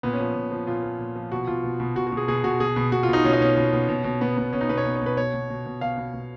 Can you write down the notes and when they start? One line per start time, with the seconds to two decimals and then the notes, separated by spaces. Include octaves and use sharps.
0.03 A#2 B3
0.13 C#4
0.20 F3
0.35 A#2
0.52 F3
0.67 A#2 F4
0.83 F3
0.99 A#2
1.16 F3
1.31 B2 F#4
1.47 B2 F4
1.64 B2
1.80 B2
1.96 B2 F#4
2.07 F#4
2.12 B2
2.17 G#4
2.28 B2 G#4
2.44 B2 F#4
2.60 B2 G#4
2.76 B2
2.92 B2 F#4
3.03 F4
3.08 B2 D#4
3.24 B2 C#4
3.33 D#4
3.41 B2 C#4
3.57 B2
3.73 B2
3.89 B2
4.04 B2
4.21 B2 B3
4.37 B2 B3
4.53 B2 C#4
4.61 D#4
4.69 B2 B4
4.77 C#5
4.85 B2
4.95 C#5
5.01 B2 B4
5.17 B2 C#5
5.34 B2
5.50 B2
5.66 B2
5.81 B2 F5
5.98 B2
6.13 B2